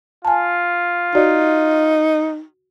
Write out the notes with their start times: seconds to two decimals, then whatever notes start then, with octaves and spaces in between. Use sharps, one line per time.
0.25 F4 G#5 A5
1.15 D#4 F#4 D5